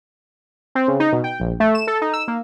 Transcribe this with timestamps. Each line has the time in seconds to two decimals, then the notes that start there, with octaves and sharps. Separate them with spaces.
0.75 C4
0.88 C#3
1.00 D#4
1.13 B2
1.24 G5
1.40 A#1
1.60 A3
1.75 E7
1.87 A4
2.02 D#4
2.13 E6
2.28 A#3